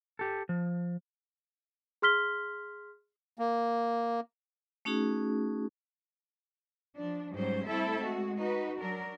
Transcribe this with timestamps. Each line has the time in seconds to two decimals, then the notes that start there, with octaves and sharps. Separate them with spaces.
0.19 G4 A4
0.49 F3
2.02 G#4 C6 F6 B6 G7
3.39 A#3
4.85 A3 C#4 D#4 F#4 G#4
6.95 F3 D4
7.32 G#2 F#3 G3 C#4 C5
7.66 G3 A3 C4 E4 A4 E5
7.97 G#3 F#4
8.36 D#4 F#4 B4
8.78 F#3 D4 A#4